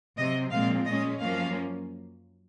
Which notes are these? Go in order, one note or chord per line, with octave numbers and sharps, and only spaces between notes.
C3 F#3 C4 D#5
A#2 F3 G#3 C4 F5
A#2 G#3 C#4 D#5
F#2 F3 A#3 C#4 F5